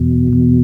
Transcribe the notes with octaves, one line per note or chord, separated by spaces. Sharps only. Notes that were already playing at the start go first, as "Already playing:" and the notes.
Already playing: E2 B2
E2